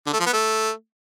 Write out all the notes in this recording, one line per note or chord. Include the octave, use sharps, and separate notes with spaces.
D3
A3
F3
B3
A3